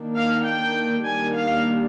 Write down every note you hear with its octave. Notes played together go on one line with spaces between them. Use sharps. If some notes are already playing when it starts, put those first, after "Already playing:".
Already playing: D#3 A#3 D4
F5
G5
D#3 G3 A#3 D4 G#5
F5